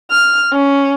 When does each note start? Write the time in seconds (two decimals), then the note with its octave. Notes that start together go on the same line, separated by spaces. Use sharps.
0.11 F6
0.53 C#4